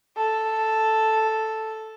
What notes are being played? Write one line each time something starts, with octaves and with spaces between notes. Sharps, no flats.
A4